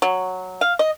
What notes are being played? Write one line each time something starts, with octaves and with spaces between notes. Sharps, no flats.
F#3
F5
D#5